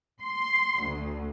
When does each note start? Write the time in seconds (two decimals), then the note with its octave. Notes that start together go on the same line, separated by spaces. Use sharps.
0.22 C6
0.80 D2